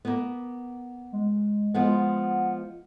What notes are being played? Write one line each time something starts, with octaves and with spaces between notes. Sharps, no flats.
A#3 B3
G#3
F3 G#3 B3 F#5